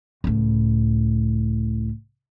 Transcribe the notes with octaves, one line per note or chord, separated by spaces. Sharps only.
C#2 A2